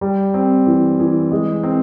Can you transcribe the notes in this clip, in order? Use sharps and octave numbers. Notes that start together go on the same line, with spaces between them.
G3
C4
E3
E3
G#3
C4